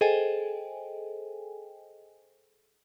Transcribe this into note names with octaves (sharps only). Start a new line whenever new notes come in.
G#4 A4 C5 D#5 G5 G#5